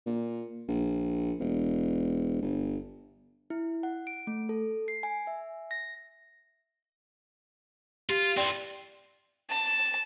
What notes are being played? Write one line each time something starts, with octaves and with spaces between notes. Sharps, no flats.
A#2
A#1
E1
G1
E4
F#5
D7
A3
A4
C7
G#5
E5
A#6
F4 G4
E3 C4 D5 G5 C6
A5